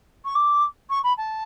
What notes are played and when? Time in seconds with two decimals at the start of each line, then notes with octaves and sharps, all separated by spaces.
0.25 C#6
0.35 D6
0.90 C#6
1.03 B5
1.17 A5